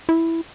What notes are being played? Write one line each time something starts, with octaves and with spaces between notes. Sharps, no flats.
E4